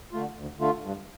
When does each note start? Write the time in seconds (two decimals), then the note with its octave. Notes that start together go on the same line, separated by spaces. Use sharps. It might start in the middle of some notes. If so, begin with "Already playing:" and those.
0.12 D3 A3 F4
0.37 D2
0.59 D3 A3 F4
0.83 G2